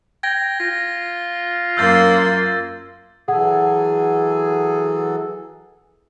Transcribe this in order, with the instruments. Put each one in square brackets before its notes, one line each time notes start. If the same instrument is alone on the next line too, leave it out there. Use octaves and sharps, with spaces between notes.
[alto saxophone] G5 [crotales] G#6 A#6
[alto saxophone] F4 [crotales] A#6
[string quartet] F#2 A#3 C6 [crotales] E6 G6 A6
[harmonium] E3 F#3 A4 [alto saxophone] G#4 [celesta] F#5